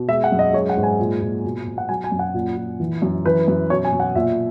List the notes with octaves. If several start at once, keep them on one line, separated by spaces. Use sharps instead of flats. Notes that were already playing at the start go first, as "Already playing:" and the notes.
Already playing: B2
G#3 E5
F#5
F#2
D#5
G#3 C#5
F#5
G#2
G#5
A#2
A#2
B2
B2
F#5
F#3 G#5
G#5
F#2
F#5
A#2
A#2
E3
F#2
E3 B4
F#2
B2 C#5
G#5
B2
F#5
A#2 E5